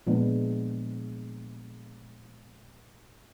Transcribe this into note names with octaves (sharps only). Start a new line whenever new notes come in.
A#2 F3 G#3 B3 D4